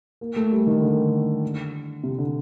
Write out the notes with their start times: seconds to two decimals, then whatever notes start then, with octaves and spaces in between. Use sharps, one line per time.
0.21 A#3
0.36 A3
0.51 G3
0.67 D#3
0.81 D3
2.04 C3
2.18 D3